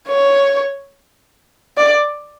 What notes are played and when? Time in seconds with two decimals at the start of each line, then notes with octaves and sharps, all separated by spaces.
0.08 C#5
1.78 D5